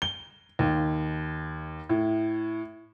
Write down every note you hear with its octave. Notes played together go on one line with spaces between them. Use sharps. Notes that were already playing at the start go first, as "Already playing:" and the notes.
G7
D#2
A2